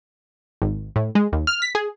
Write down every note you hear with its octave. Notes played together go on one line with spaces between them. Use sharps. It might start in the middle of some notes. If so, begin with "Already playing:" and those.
G#1
A2
G#3
D#2
F6
B6
G#4